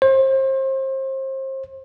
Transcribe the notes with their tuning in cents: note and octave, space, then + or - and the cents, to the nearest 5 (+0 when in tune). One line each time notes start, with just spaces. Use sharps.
C5 +30